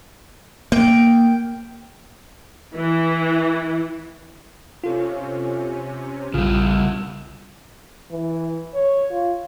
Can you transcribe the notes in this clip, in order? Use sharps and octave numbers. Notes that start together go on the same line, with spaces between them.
A#3 G5
E3
C3 C#4 F4 A4
A#1 C#3 G3 F4 F6
E3
C#5
F4